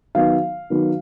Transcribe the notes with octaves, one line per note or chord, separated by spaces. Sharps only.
D#3 F#3 B3 D#4 F5
D#3 F#3 B3 D#4